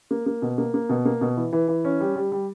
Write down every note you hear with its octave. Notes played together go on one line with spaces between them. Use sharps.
A#3
A#3
B2
A#3
A#3
B2
A#3
B2
E3
E3
E3
C#4
G3
G3
G3